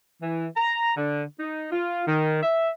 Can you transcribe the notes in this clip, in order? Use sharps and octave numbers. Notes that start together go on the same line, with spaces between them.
E3
A#5
D3
D#4
F4
D#3
E5